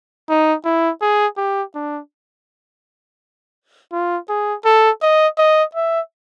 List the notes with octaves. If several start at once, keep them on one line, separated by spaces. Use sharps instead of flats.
D#4
E4
G#4
G4
D4
F4
G#4
A4
D#5
D#5
E5